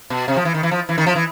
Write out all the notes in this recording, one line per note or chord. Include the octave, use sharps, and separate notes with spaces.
B2
C3
F3
E3
D#3
E3
F3
E3
D#3
F3
E3